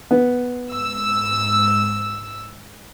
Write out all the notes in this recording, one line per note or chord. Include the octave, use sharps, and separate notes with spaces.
B3
G#2 E6